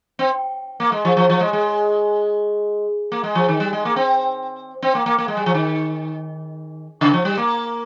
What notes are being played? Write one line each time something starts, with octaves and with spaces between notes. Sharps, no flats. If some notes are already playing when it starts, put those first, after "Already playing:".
C4
A#3
G#3
F3
F3
F3
G#3
G#3
A#3
G#3
F3
D#3
G3
G#3
A#3
C4
C4
A#3
A#3
A#3
G#3
G3
F3
D#3
C#3
F3
G3
A#3